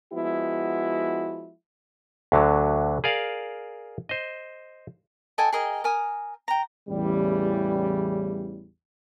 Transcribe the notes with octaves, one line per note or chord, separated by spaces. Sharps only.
F3 G#3 B3 E4 F#4
D2 D3 F#3
G#4 A#4 D5 F5
C5 D#5
A4 D#5 G5 G#5
G#4 A#4 D#5 G5
A#4 G#5 D#6
G5 A#5
A1 E2 C#3 E3 G3